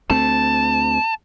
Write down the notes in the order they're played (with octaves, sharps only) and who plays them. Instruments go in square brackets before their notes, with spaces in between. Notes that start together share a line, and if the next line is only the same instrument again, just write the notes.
[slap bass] D2 A3 C4 [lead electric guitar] A5